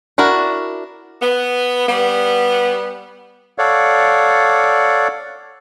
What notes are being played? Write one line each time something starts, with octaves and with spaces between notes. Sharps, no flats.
D4 E4 F#4 A#4
B3
G3 B3
A4 C#5 D5 F5 F#5